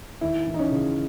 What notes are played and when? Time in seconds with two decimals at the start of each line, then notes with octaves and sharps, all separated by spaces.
0.21 D#2 E4
0.47 E3
0.54 D#4
0.59 C#4
0.72 C#3